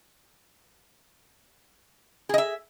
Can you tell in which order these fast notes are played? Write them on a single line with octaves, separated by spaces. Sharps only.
G#4 D#5 E5